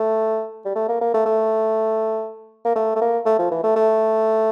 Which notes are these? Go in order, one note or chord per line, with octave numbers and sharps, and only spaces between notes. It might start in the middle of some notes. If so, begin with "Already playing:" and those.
Already playing: A3
G3
A3
A#3
A#3
A3
A3
A#3
A3
A3
A#3
A3
F3
E3
A3
A3